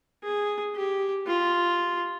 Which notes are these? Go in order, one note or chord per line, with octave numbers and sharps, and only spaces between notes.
G#4
G4
F4